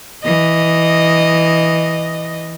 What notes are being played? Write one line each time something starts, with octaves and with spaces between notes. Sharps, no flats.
E3 D#5